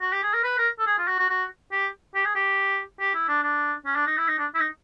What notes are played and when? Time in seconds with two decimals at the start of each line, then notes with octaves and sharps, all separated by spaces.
0.01 F#4
0.12 G4
0.23 G#4
0.34 A#4
0.43 B4
0.58 A#4
0.79 A4
0.87 G#4
0.98 F4
1.08 F#4
1.19 F#4
1.30 F#4
1.72 G4
2.15 G4
2.25 G#4
2.35 G4
3.00 G4
3.15 E4
3.28 D4
3.43 D4
3.86 C#4
3.96 D4
4.07 D#4
4.18 E4
4.28 D#4
4.38 D4
4.55 E4
4.60 D#4